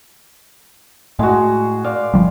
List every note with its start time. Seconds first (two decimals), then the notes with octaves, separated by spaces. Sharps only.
1.19 A2 G#3 F#4
1.84 D5 F5
2.14 G1 F3 G3